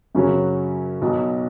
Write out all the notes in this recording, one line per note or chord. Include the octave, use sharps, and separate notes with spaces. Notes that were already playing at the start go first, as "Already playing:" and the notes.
F#2 C#3 F#3 C#4
B1 B2 F#3